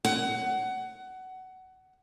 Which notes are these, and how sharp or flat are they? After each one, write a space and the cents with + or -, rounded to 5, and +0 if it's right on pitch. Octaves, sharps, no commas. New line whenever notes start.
F#5 +20